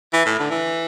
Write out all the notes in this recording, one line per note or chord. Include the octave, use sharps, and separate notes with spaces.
E3
A2
D3
E3